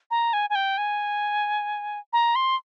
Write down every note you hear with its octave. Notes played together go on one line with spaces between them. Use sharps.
A#5
G#5
G#5
G5
G#5
A#5
C6